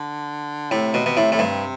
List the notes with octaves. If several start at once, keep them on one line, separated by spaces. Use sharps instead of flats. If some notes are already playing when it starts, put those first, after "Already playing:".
Already playing: D3
A2 C3
B2
B2
A2
A2
G2